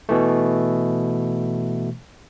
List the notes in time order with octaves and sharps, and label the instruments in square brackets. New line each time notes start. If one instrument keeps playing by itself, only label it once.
[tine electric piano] B2 E3 A3